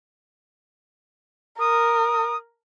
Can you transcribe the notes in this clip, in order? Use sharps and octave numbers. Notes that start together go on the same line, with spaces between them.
A#4 D#6